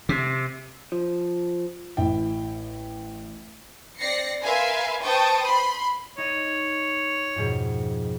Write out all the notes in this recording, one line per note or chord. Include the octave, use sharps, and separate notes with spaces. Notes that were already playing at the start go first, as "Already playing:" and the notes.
C3
F3
A1 E4 G5
C4 D5 A#6 C7 C#7
A#4 B4 E5 F5 G#5 C6
B4 C5 G5 A5 C#6 D#6
B5 C6
D#4 C#5 D#5
F2 G#2 B2